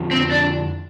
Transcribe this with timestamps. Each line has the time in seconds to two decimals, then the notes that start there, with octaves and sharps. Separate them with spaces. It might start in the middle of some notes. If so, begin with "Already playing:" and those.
Already playing: F2 D3 F3
0.11 C4
0.31 D4